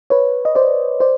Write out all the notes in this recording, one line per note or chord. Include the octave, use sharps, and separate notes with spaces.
B4 C#5
D#5
C5 D5
C5 D5